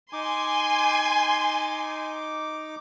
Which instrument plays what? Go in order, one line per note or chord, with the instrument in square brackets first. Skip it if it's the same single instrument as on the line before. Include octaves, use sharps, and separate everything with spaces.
[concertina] D#4 D6 [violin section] G#5 C6